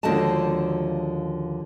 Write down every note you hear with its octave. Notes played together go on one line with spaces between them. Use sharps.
D#2 D3 F3 G#3 F#4 A5